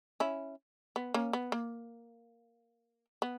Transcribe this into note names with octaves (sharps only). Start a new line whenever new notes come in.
C#4 E4
B3
A#3 C#4
B3
A#3
B3